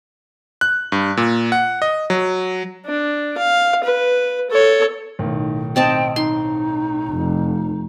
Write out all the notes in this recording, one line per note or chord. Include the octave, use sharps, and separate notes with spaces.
F#6
G2
A#2
F#5
D#5
F#3
D4
F5
B4
A4 C#5
B1 A2 D#3
C4 D#5 G5 A5
D#4 C6
F1